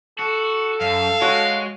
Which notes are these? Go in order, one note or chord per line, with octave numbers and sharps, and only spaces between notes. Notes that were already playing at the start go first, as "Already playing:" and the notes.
F#4 A4
F#2 F5
G#3 F#4 C#5